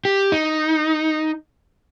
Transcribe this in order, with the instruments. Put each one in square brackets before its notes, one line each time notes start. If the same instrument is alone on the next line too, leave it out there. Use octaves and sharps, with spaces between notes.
[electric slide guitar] G4
D#4